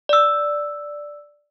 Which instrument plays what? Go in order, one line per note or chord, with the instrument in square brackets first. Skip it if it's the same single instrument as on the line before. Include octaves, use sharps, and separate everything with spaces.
[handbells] D5 E6